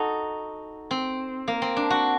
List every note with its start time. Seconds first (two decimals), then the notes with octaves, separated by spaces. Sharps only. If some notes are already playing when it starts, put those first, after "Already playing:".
Already playing: D#4 F#4 A4
0.91 C4
1.48 A#3
1.62 C4
1.77 D4
1.90 F#4